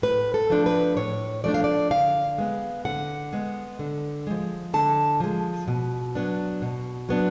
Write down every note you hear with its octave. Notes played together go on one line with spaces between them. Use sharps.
A2 B4
A4
F3 A3 D4
B4
A2 C#5
F3 A3 D4 D5
F5
D5
D3 F5
G#3 B3
D3 F#5
G#3 B3
D3
F3 G#3
D3 A5
F3 G#3
B2
F#3 B3 D4
B2
F#3 B3 D4